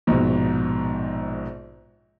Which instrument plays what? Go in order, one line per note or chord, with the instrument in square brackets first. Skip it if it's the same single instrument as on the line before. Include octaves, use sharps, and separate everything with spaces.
[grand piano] A#1 G#2 B2